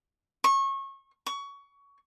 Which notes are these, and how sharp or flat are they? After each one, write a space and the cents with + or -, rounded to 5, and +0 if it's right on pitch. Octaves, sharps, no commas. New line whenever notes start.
C#6 -25
C#6 +20